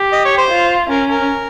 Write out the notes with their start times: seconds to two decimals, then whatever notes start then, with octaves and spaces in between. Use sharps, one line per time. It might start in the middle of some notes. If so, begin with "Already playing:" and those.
Already playing: G4
0.12 D#5
0.25 C#5
0.38 C5
0.51 F4
0.90 C#4 A#4
1.09 A#4